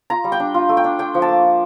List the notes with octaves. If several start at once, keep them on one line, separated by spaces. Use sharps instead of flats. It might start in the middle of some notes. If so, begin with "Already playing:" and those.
F4 A#5
G3
G5
D4
F4
A3
G5
D4
D4 G5
F3
A5
A#3
F4